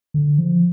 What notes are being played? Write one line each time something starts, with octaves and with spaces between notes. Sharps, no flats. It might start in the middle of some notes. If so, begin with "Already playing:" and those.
D3
F3